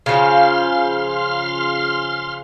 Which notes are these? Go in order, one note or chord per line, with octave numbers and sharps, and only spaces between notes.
C#3 F3 C6 F6